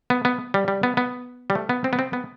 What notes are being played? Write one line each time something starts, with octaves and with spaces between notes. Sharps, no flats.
B3
B3
G3
G3
B3
B3
G3
A3
B3
C4
B3
C4
B3